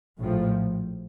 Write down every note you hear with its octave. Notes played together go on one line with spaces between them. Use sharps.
A#1 A2 F3